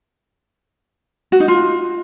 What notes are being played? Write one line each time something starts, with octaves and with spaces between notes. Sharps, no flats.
F#4
D#4
F4